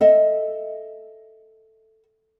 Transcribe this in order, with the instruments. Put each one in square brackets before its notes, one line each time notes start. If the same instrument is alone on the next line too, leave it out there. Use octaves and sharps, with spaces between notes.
[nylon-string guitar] A4 D#5 E5